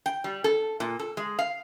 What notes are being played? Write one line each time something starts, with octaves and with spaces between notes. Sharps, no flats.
G5
G3
A4
A#2
A4
G#3
F5